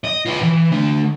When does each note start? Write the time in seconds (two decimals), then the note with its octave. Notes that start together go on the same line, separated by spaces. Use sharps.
0.05 D#5
0.26 F4 B4
0.43 E3
0.72 D3 A3